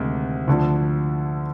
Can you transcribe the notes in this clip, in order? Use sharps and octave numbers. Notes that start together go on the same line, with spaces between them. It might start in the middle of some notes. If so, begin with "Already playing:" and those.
Already playing: D2 C3 D#3 G#3
D2 D3 F3